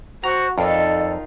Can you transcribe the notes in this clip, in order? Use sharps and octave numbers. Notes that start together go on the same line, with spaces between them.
F#4 C5 A#5
F2 D#3 D#4 F4 A4 D5